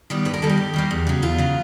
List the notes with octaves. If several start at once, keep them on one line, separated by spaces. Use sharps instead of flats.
D#3 G3 B3
G2 B4
A#4
D#3 G3 A#3 A4
G4
G2
D#3 G3 A#3
E2
C#3 F#3
E2 F4
C#3 F#3